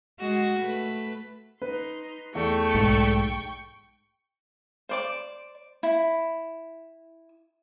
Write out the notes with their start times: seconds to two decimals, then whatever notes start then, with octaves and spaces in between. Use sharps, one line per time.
0.20 G#3 F#4
0.59 A3 B4
1.62 D#4 B4 C6
2.35 E2 A3 G5 C#6
2.74 B1 G#2
4.89 C5 D5 D6
5.83 E4